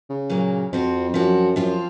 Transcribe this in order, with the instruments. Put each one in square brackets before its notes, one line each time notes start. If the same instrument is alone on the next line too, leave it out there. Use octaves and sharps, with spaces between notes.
[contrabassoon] C#3
[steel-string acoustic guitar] A#2 F#3 A#3
[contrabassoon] F2 [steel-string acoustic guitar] F3 C4 F#4
[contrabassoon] F#2 [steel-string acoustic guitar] F3 C4 F#4
[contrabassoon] F#2 [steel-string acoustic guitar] F3 C4 F4